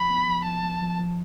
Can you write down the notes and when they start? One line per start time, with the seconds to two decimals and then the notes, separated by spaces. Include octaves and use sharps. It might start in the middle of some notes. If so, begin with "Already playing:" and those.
Already playing: F2 F3 B5
0.10 B3
0.28 F3
0.45 F3 A5
0.64 F3
0.81 F3
1.00 F3